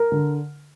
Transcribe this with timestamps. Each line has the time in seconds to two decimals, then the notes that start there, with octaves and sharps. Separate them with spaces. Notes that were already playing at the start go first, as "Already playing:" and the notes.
Already playing: A#4
0.12 D3